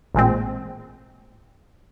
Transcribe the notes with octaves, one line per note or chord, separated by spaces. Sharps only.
A1 A#2 G#3 C4